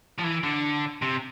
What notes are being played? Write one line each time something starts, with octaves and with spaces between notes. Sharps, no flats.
F3
E3
D3
C3